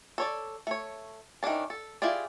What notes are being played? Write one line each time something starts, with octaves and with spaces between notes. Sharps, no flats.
A4 C#5 D5
A3 C#5
D#3 E3 C#4 D4 A5
A4
E4 F4 G4 G#4 D5